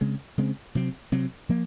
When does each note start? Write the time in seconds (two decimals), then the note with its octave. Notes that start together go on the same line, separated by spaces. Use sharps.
0.01 C#3 G#3 C4
0.38 C#3 G#3 C4
0.75 C3 F#3 C4
1.12 C3 F#3 C4
1.49 F3 A#3